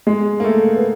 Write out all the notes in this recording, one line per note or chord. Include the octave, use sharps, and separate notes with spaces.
G#3
A#3
A3
B3